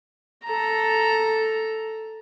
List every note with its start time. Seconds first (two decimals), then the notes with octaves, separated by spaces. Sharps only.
0.45 A4 A#5